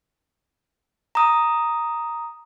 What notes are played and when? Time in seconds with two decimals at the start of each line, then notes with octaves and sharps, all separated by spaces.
1.15 A#5 D#6